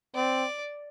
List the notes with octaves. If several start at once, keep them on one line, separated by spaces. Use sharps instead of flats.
C4 D5